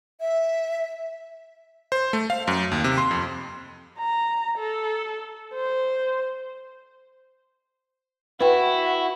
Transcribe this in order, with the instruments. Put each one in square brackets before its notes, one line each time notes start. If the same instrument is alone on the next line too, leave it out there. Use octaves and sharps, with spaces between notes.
[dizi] E5
[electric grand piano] C5
A3
F5
F#2
D#2
C3
C6
F2
[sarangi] A#5
A4
C5
[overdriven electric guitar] E4 [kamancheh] F#4 [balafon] B4 G5